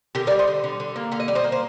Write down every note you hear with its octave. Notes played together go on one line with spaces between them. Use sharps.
D3 G4 A#4
A#4 D5
G3
C5 D#5
D3
D3
D3
A#3
D3 F5
D#5
G3 D5
C5 D#5
A#3
C5